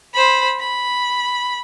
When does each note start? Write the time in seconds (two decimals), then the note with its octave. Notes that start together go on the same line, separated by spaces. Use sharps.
0.13 C5 B5
0.59 B5